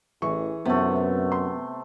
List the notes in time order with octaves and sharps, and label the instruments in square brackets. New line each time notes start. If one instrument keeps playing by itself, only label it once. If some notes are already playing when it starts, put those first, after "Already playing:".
[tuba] A1 [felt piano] E3 C#6 [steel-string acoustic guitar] G#4
[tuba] F#2 [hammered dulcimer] C3 A3 [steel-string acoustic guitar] B3
[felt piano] C6